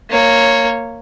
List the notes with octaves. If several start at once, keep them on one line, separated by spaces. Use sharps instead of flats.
A#3 C#5